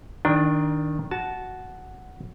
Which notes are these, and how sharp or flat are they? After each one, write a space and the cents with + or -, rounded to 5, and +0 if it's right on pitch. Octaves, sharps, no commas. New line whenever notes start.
D#3 +5 D4 +0 D5 +35
F#4 +0 A5 -15